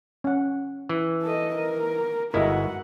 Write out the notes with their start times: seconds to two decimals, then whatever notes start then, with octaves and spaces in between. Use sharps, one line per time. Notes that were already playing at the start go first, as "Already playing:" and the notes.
0.24 C#4 F#5
0.89 E3
1.22 A4 D#5
1.55 A#4
2.34 G1 G#3 E4 F#4 A#4 D#5 E5 F#5